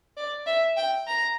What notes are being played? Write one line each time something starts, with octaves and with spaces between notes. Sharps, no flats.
D5
E5
G5
A#5